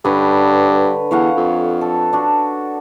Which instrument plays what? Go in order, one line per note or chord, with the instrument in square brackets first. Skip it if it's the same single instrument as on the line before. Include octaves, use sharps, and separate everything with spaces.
[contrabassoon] G2 [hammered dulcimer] D3 B4 C#5
[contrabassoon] E2 [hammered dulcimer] C#5 F5 F#5
[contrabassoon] F2
[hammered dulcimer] A4
D4 F#4